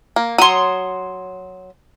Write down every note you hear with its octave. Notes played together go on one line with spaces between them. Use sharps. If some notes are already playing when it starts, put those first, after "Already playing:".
A#3
F#3 C#5 C6 D#6